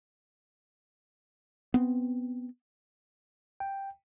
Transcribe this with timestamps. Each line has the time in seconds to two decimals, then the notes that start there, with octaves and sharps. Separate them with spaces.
1.74 B3 C4
3.60 G5